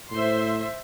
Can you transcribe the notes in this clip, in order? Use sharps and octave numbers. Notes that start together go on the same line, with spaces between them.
A2 C5 E5 C6